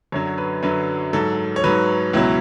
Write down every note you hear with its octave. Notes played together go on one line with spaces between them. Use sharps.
F#2 D3 F#3 C#5
B4
F#2 D3 F#3 B4
G#2 F#3 A4
C#5
G#2 F#3 B4
C#2 B2 F#3 E4